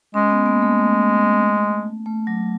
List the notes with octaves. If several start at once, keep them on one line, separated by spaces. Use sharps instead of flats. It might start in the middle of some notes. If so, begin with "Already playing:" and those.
G#3 C#4
B3
A#3
A3
A3
A3
F#3